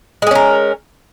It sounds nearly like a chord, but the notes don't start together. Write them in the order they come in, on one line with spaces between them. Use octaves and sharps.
G#3 G#4 C#4 A#4